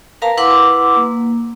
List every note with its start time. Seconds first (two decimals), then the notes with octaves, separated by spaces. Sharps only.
0.22 A#4 B4 F5 A5 A#5
0.37 E4 B4 F#5 C6 D6 E6
0.96 A#3